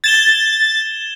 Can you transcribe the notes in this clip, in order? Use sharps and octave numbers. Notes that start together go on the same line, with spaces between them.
G#6 A6 E7 G7